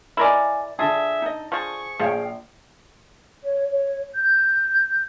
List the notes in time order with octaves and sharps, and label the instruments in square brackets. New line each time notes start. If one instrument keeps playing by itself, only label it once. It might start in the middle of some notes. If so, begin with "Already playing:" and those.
[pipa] E4 A#4 D5 [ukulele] A4 D#5 G#5
[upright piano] D3 A5 [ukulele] F4 [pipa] G#4 [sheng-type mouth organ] E5
[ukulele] D#4 D#5
[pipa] F3 G#4 [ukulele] F4 [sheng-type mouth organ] C#6
[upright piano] A#1 F5 [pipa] F3 [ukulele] G#4 C#5 G5
[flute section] C#5
C#5
G6